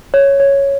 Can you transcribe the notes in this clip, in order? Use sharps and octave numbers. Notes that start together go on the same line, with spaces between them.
C#5
C#5